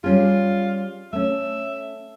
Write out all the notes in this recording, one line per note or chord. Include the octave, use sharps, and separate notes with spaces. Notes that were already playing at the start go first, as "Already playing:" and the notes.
G3 C#4 F4 G#4
A3 C#4 E5